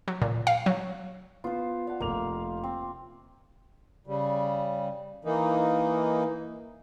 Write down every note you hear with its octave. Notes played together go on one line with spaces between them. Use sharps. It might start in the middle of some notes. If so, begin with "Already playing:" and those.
F#3
A#2
F5
F#3
B3 F4 C5
D5 F5 F#5
F1 A#3 A#4 F7
C4
C#3 G3
E3 A#3 D#4